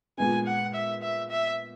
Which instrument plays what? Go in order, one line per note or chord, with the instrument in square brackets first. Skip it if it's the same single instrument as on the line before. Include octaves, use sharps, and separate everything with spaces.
[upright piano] A#2 G#3 B3 [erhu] G#5
[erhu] F#5
E5
E5
E5